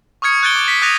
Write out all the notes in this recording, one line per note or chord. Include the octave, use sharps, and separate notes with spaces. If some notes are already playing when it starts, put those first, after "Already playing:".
C#6 D#6 F6 G#6 C#7
F#6 G6 A6 D7 G7
D6 D7
B6 C#7
D#6 F#6 A6 A#6 D#7 F7